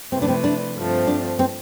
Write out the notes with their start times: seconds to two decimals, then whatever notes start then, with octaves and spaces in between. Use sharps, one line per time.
0.12 C3 F3 A3 C4 E4 B4
0.22 D4
0.28 C4
0.44 D4
0.76 G2 F3 A3 C4
1.07 D4
1.39 C4